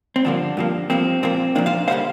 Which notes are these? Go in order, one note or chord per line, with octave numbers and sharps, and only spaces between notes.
C4
G2 D3 F3 A#3 D4
G2 F3 A#3
G2 F3 A#3 C4
A#2 F3 A#3 C4
A#2 F3 A#3 D4
C5 F5
D3 G3 A#3 C5 F5